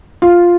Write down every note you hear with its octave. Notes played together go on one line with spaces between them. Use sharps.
F4